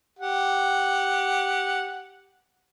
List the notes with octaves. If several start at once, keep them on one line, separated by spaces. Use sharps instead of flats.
G4 F#5